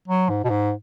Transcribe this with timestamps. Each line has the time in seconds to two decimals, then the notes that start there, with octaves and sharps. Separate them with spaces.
0.08 F#3
0.29 G#2
0.44 B2
0.50 G#2